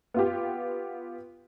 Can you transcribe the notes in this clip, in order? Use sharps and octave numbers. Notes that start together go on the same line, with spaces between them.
B3 F4 G4